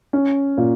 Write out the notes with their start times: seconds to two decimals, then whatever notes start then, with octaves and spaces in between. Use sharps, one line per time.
0.13 C#4
0.57 A#2